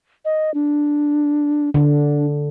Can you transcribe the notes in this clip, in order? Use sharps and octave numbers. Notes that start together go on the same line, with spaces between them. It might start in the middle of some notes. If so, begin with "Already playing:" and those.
D#5
D4
D3 D4